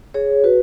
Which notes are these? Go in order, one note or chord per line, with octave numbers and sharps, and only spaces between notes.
G#4 C#5
F#4 B4